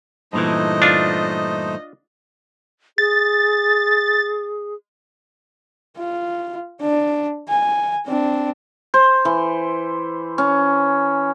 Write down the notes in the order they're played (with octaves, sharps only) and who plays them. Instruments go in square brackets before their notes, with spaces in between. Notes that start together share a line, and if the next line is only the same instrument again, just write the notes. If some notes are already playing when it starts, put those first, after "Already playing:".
[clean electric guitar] G2 A#2 E3 [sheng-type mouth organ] A3 D#4 C5 [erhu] D#5
[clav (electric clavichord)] D4 F4
[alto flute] G#4 [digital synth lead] A6
[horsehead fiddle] F4
D4
G#5
C4 D4
[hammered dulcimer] C5
E3
C#4